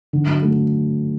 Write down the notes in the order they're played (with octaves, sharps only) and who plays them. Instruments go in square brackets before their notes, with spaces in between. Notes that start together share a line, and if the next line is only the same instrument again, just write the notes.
[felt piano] D3
F#3
A3